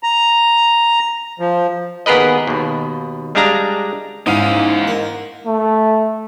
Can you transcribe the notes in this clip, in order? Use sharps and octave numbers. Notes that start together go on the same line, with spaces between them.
A#5
F3
D#2 B3 G#4 A#4 B4 D#5
D#2 B2
G3 G#3 D4 F5 A#5
G#2 C#4 D#4 E4 F5 D#7
A#4
A3